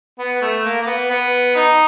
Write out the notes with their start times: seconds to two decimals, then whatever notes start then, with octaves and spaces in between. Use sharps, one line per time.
0.19 B3
0.42 A3
0.65 A#3
0.82 A#3
0.87 B3
1.10 B3
1.56 D#4